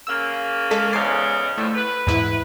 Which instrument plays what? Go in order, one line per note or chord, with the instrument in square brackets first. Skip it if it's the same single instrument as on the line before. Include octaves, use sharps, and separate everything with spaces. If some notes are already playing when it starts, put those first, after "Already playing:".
[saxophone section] C#3 A#3 [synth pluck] E6
[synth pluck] G#3 A4 B6
[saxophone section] E2 G#2 C#3 [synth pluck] D6 A6 C7
[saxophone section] A2 D3 F3 [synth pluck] A3
[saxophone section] B4
[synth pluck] E2 G#2 E4